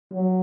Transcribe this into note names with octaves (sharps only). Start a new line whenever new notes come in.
F#3